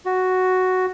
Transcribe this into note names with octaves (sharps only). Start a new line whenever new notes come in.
F#4